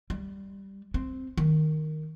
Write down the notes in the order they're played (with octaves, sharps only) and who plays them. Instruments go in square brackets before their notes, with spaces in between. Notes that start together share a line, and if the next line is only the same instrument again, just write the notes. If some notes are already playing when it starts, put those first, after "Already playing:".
[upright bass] G3
C4
D#3